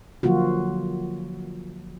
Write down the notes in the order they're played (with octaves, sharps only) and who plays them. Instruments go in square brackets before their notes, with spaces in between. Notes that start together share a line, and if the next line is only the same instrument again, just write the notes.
[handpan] D3 F3 F#3 A#3 F4 F#4